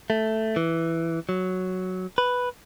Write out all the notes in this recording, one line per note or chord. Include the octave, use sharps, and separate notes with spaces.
A3
E3
F#3
B4